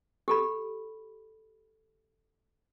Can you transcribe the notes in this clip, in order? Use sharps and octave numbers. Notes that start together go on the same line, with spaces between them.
G4 A4 B5